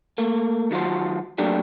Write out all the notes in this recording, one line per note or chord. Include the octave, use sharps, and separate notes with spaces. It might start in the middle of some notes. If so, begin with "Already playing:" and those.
A3 A#3
D#3 F#3 F4 F#4 C5
F#3 A3 A#3 D4 G4